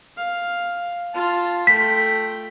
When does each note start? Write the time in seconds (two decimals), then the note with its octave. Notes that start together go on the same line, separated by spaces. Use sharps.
0.17 F5
1.14 F4 A5
1.67 A3 G5 B6